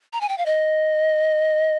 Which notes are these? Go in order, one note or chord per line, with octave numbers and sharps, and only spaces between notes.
A#5
G#5
G5
F5
D#5